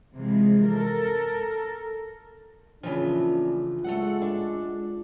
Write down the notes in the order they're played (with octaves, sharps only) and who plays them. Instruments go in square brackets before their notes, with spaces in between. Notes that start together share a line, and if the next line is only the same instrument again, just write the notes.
[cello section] C3 E3 F3 G#3
A4 A#4
[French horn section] A2 A#3 D4 [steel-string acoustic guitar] C#3 E3 F3 [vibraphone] F4
[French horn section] G#3 [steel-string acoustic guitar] A3 A4 F#5
[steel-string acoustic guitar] D4